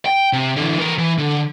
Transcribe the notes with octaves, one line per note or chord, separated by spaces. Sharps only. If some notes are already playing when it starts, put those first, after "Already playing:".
G5
C3
D3 E3
E3 A#4
E3
D3